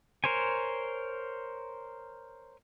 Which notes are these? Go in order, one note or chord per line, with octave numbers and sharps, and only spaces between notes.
A#4 C5 C#5 G#5